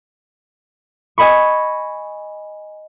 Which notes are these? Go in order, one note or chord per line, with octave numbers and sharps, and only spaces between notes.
D#5 G#5 B5 C#6